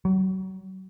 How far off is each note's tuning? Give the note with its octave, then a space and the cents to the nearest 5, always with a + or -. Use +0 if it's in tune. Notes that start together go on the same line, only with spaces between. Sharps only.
F#3 +35